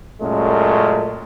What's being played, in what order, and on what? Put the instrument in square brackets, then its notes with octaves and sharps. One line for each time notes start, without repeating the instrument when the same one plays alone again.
[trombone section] F#2 A#2 G#3 A3 C#4